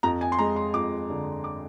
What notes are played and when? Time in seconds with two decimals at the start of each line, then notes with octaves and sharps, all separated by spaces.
0.03 F2 A#5
0.21 G#5
0.32 C6
0.38 G#3 A#5
0.56 C6
0.74 F2 D6
1.10 D3
1.44 D6